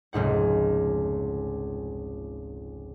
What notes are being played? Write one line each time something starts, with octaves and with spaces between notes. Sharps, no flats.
F1 C#2 G#2 F#5